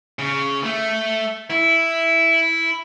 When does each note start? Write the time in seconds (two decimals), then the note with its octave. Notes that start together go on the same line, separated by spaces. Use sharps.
0.19 C#3
0.64 A3
1.50 E4